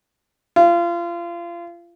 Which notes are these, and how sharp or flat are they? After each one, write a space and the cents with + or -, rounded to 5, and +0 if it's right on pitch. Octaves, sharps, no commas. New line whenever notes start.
F4 -30